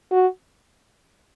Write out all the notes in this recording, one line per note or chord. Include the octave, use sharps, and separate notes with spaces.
F#4